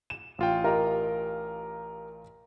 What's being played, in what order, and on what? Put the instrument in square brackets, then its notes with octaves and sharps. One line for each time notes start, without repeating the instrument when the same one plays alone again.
[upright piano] E7
[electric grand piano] A1 F4 G5
[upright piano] G4 A#4 D#5